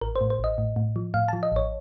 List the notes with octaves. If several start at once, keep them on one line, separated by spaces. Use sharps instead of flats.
A1 A#4
C5
A2
C5
A1
D#5
A2
A2
F3
A2 F5
F3 A5
D#5
A1 C#5